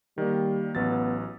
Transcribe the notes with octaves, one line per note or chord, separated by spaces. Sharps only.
D#3 G3 A#3
A1 F#3 B3 A6